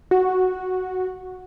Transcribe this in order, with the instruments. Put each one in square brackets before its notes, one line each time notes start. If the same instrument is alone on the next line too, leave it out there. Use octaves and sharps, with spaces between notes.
[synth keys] F#4